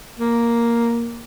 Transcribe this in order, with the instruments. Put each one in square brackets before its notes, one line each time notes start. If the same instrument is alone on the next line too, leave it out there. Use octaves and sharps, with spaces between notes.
[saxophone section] A#3